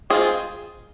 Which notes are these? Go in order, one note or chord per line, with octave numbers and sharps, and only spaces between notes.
G#3 C4 F4 G#4